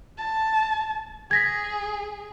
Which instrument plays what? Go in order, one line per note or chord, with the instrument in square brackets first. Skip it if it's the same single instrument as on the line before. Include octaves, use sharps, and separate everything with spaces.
[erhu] A5
[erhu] G#4 [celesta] G#6 A#6 B6